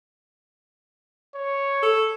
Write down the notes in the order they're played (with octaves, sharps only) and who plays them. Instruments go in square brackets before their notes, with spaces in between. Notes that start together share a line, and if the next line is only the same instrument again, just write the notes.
[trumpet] C#5
[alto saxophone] A4